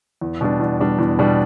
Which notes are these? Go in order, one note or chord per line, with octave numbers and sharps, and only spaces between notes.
E2
B2 G3 D4
E2
B2 G3 D4
E2
B2 G3 D4